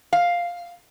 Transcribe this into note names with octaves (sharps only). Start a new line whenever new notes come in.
F5